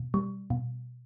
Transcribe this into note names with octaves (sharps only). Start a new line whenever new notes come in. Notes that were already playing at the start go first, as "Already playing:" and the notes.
Already playing: B2
G3
B2